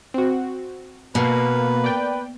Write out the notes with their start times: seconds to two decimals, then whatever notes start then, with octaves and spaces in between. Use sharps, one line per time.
0.14 C4 F#4
1.15 B2 A#3 B4
1.84 D5 G5